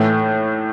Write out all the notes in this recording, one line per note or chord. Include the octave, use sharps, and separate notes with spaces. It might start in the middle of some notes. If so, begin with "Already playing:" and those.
Already playing: A2 E3 A3